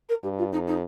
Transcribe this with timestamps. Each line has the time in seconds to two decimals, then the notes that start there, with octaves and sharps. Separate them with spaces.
0.09 A#4
0.23 G2 G4
0.38 F4
0.52 F2 D#4
0.67 D#4